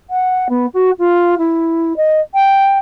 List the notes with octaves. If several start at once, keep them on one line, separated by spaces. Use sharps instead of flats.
F#5
B3
F#4
F4
E4
D#5
G5